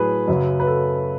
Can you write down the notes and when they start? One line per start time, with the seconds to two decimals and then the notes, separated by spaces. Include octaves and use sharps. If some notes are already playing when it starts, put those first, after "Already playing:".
Already playing: A2 F#3 G#4 B4
0.28 F#2 C#3 F#3
0.60 B4
0.67 A4